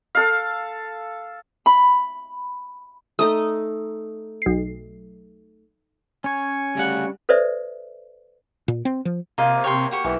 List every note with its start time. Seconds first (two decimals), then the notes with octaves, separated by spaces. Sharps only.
0.15 A4 F5
1.66 B5
3.19 A3 D#4 D#5 D#6
4.42 B1 C7
6.24 C#4 C#5 G#5
6.75 D2 C#3 G3 F#5
7.29 A4 B4 C5 D5 E5
8.68 A#2
8.85 C4
9.05 F3
9.38 C3 A#3 F4 D#5
9.64 C#5 G5 C6
9.91 F#4 G4 C#6
10.04 B1 E3